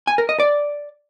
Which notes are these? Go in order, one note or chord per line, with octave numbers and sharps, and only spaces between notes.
G#5
A#4
D#5
D5